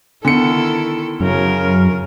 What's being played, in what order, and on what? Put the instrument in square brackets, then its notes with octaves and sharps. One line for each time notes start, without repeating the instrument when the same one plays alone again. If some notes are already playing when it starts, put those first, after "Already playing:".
[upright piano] D3 C#7 [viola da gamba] D#3 E4 A4 [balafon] B3
[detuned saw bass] F#2 [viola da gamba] C#3 A#4